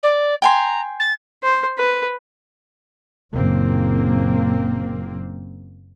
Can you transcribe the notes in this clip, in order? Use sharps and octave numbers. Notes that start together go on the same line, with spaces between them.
D5
G5 G#5 A#5 C6
A6
C5
B4
F#1 A#2 A#3 C4